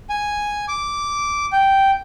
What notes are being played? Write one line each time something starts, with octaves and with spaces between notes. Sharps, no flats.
G#5
D6
G5